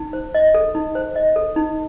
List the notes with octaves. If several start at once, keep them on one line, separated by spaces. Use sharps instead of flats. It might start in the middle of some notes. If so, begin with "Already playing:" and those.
Already playing: D#4
C5
D#5
A4
D#4
C5
D#5
A4
D#4